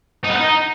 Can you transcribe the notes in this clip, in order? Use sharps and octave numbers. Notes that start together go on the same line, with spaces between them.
D#4
B3
D#4